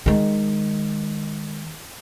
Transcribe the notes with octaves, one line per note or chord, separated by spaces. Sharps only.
D#3 G#3